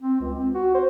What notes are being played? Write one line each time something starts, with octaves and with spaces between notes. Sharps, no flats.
C4
C#2
C4
F#4
C5